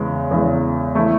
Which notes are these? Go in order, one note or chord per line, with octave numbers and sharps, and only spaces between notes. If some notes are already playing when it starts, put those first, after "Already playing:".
Already playing: E2 C#3 G#3
E2 C#3 G#3
E3 A3 E4